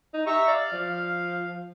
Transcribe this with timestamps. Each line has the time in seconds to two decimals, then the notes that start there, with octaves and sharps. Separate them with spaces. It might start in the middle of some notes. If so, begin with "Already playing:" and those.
0.14 D#4
0.27 G4 E5 A#5 C#6
0.48 D5 F5
0.73 F3